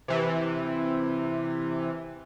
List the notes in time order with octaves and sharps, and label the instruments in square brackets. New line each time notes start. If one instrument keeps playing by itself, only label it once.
[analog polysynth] C3 E3